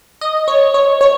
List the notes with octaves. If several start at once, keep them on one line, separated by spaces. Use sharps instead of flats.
D#5
C#5
C#5
C#5